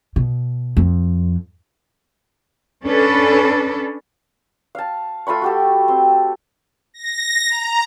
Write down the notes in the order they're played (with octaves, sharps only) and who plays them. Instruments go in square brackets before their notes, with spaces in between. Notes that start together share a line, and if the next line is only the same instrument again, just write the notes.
[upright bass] B2
F2
[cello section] C#4 D4 A4 B4
[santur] F5 A5
A3 F4 B5 C#6
F#4 G4 A4
C4
[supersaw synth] A#6
A#5